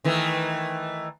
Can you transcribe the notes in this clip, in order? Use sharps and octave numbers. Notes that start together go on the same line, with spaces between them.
D#3 E3 A3